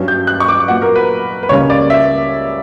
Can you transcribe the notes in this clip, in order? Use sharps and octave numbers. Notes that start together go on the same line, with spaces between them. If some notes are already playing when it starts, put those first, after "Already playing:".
Already playing: G2 F#3 C#4
G6
F#6
C#6
D6
A#2 F#3 B3 F#5
A#4
B4
B4
C#2 C#3 G3 A#3 C#4 C#5
D5
E5